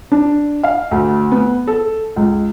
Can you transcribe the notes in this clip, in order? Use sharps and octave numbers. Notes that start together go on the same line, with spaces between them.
D4
F5
D2
B3
A4
C#2